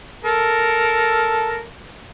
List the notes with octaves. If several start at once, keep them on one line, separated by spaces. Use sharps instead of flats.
A4 A#4